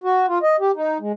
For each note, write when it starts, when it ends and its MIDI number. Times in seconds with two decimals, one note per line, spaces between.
0.04 0.26 66
0.28 0.38 65
0.43 0.56 75
0.60 0.71 67
0.76 0.98 63
1.00 1.12 56